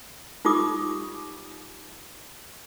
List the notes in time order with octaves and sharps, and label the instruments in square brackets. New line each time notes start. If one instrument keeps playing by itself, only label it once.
[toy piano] D#4 F4 G4 D6 D#6